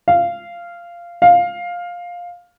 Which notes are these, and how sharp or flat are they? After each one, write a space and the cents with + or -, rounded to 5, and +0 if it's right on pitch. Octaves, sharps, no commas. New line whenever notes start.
F5 -15
F5 +10